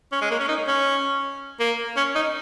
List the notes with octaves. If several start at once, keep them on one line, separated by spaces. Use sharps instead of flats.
C#4
G#3
A#3
C#4
D#4
C#4
A#3
C#4
D#4